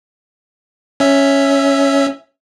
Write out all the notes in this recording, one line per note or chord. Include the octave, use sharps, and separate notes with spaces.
C#4 E5